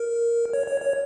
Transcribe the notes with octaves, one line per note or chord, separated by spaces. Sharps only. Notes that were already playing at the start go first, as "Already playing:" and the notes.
Already playing: A#4
C#5
C#5
C#5